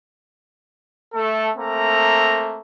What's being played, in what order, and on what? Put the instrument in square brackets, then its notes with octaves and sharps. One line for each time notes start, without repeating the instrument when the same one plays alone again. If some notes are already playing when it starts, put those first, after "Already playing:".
[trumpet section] A3 A4
A3 A#3 C4 A#5